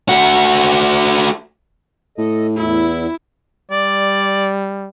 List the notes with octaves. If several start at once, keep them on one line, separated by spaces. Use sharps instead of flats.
A3 F#4
A2 A4 D#5
E2 E4
G3 D5